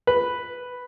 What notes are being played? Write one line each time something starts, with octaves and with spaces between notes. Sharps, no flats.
B4